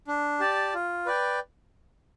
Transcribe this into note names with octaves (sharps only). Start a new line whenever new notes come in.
D4
G4 D5 A5
F4
B4 D5 G5